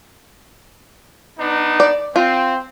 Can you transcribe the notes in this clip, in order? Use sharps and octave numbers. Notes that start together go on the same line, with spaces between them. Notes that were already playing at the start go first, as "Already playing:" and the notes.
B3 D4 D#4
D5
C4 F4